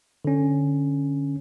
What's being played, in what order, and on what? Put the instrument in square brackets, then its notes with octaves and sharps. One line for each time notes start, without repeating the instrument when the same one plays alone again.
[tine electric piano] D3 C#4